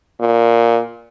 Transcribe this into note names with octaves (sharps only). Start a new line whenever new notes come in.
A#2